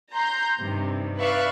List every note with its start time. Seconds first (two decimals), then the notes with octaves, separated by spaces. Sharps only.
0.14 A#5 C6 G6
0.58 G2 C3 D#3
1.19 B4 D5 E5 F5 C#6 F#6